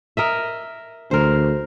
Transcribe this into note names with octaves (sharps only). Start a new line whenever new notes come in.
A#4 D#5 E5
D2 A#4 C5